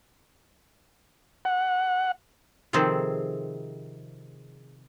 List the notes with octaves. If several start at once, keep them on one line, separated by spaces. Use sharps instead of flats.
F#5
C3 D#3 F3 C4 G#4 A4